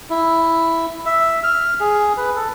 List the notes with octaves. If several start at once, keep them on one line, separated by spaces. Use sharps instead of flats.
E4
E5
F6
G#4
B4
A4